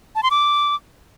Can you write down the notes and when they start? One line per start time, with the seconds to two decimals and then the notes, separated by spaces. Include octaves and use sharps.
0.15 A5
0.23 C6
0.31 D6